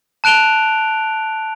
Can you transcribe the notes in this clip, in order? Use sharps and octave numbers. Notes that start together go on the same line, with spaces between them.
A5 F#6 D7 F7 G7